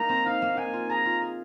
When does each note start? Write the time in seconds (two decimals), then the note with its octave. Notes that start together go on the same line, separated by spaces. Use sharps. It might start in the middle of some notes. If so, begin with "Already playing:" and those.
Already playing: A#3 D#4 A#5
0.09 C4
0.26 D#4 F5
0.42 A#3
0.57 D#4 G#5
0.73 F4
0.90 G#4 A#5
1.05 F4
1.22 G#4